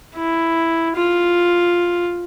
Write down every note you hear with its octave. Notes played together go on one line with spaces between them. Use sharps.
E4
F4